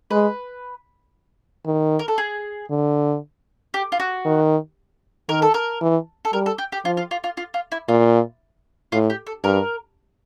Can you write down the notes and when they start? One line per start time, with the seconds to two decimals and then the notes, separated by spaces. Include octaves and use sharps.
0.11 G#3 B4
1.66 D#3
1.99 A#4
2.08 A4
2.18 G#4
2.70 D3
3.74 G4
3.92 F4
4.00 F#4
4.25 D#3
5.29 D#3 A#4
5.42 A4
5.54 A#4
5.81 E3
6.25 A4
6.33 G3 A#4
6.46 A4
6.58 G4
6.72 G4
6.85 F3 F4
6.97 F4
7.11 F4
7.24 F4
7.37 F4
7.54 F4
7.72 E4
7.88 A#2 F4
8.92 A2 F4
9.10 G4
9.27 A4
9.44 G2 A#4